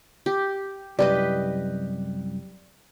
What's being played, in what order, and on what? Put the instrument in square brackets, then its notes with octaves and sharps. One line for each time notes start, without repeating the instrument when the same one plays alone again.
[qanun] G4
[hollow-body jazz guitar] C2 F#2 [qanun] G4 B4 D#5 [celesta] D5